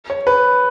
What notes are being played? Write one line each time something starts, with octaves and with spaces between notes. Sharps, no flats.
C#5
B4